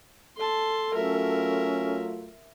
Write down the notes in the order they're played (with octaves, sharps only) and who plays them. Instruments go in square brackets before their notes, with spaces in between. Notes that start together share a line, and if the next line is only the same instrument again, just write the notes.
[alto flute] A4 [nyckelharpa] A5 C6
[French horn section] F#3 A3 F4 [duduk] C#4 [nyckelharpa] A#4 E5